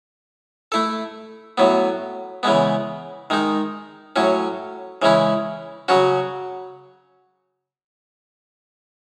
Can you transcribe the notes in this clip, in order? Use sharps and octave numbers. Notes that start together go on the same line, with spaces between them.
A3 E4 A4
A2 F#3 B3
C#3 E3 G#3 B3
D#3 G#3 D#4
A2 F#3 C#4
C#3 E3 G#3 C#4 E4
C#3 F#3 C#4 F#4